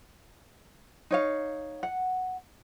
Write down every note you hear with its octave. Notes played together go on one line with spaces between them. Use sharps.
D#4 C#5 F5
F#5